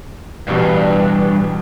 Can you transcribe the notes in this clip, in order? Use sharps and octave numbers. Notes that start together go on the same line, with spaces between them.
A1 G2 B2 E3 G3